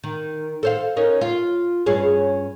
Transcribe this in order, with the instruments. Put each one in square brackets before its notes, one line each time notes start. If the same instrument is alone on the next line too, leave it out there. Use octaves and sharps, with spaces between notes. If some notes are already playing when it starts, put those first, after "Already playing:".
[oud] D#3
A4 C5 F5
C#4 D#4 A#4
F4
G2 C#4 G#4